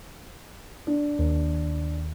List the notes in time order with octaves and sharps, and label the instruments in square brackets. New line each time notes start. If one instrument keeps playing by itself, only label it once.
[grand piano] D4
[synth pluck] D#2